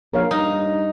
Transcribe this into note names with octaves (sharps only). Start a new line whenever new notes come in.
A#1 A#4 C#5 F5
G2 D#4